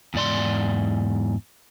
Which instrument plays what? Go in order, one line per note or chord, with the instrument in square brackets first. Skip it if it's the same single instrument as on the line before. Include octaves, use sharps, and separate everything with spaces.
[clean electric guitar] E2 G#2 D5 C6